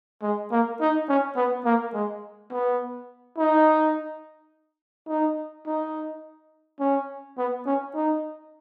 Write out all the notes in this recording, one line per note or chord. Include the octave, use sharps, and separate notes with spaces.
G#3
A#3
D#4
C#4
B3
A#3
G#3
B3
D#4
D#4
D#4
C#4
B3
C#4
D#4